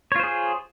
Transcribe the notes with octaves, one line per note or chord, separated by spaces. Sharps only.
F4 G#4 C5 C#5